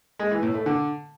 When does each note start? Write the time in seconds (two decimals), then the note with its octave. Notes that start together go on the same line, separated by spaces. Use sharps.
0.19 G#3
0.31 E3
0.43 A2
0.54 A3
0.66 D3